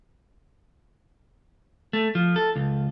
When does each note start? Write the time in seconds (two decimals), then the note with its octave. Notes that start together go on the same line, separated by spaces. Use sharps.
1.93 A3
2.15 F3
2.36 A4
2.56 C#2